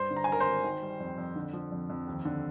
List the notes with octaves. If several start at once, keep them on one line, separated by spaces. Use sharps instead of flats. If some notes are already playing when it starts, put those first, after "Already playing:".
Already playing: G2 C5 C6
D3
A#5
G#5
G#1 A#4 A#5
C5 C6
G#1
D#3
G3
F2
F2
D3
F3
F2
F2
D#2
D3